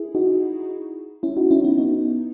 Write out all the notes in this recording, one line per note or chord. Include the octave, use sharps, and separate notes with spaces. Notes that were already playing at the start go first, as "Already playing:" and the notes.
Already playing: E4 G#4
D#4 F#4
C#4 E4
D#4 F#4
C#4 E4
B3 D#4
B3 D#4